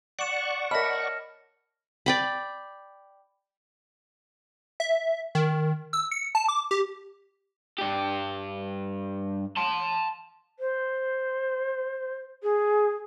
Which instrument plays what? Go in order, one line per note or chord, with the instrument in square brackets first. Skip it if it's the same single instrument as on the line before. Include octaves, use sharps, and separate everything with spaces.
[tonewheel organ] D5 F#5 C#6 [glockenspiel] C#7 E7
[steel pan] A#4 E5 B5 [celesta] C#5 D#5 A5 [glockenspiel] F6 A#6
[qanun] D5 G5 B5
[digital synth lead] E5
D#3
E6
C#7
A5
D6
G4
[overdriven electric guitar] G2 G4
A5 C6
[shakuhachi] C5
G#4